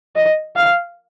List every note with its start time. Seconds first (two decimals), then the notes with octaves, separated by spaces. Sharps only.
0.16 D#5
0.56 F5